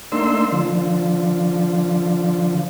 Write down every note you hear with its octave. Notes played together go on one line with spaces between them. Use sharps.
A3 A#3 D4 D#4 C6 E6
D3 F3